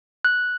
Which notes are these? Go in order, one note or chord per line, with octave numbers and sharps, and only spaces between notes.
F#6